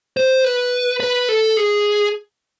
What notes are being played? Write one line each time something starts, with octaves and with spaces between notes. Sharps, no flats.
C5
B4
B4
A4
G#4